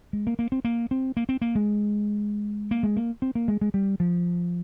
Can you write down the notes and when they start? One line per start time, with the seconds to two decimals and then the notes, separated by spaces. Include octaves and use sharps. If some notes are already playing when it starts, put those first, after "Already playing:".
0.13 G#3
0.27 A#3
0.39 A#3
0.52 C4
0.65 A#3
0.91 C4
1.17 A#3
1.29 C4
1.42 A#3
1.55 G#3
2.71 A#3
2.83 G#3
2.97 A#3
3.22 C4
3.35 A#3
3.48 G#3
3.61 G#3
3.74 G3
4.00 F3